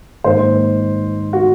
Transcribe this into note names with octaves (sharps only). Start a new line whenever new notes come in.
G#2 D#3 A#3 C5
F#4